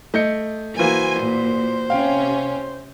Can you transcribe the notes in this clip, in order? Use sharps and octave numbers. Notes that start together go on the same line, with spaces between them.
A3 D#5 G6 C#7
E3 A#3 F#4 C5 G#5
A#2
C3 C#4 F5 G5